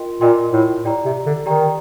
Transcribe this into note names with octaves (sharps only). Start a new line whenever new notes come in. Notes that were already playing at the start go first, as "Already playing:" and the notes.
Already playing: F4 A#4 D#5 G5 C6
A#2 F4 A#4 D#5 G5 C6
A2
A2 G4 D5 G5 A#5
C3
D3
D#3 G4 D5 G5 A#5